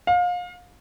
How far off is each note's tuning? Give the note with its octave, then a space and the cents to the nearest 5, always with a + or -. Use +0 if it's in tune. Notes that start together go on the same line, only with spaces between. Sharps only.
F5 +30